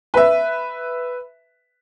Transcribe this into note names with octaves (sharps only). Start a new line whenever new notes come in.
B4 E5